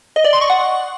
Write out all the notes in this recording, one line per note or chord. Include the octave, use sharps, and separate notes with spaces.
D#5
D5
C6
C#6
F#5